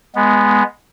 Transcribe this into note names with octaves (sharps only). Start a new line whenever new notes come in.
G#3 B3